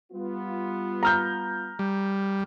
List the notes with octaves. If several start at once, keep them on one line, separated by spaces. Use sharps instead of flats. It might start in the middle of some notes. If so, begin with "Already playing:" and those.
G3 B3 F4
A#5 F6 G6
G3